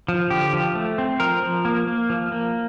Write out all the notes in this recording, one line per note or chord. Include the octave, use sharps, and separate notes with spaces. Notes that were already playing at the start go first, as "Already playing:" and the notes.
F3
D3 G4
F3
A3
C4
F3 A#4
F3
A#3
A#3
F3
A#3